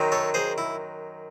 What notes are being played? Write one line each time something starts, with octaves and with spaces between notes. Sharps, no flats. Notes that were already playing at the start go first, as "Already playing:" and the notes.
Already playing: F#2 D#3 F#3
A4 C#5
G#4 C5
E4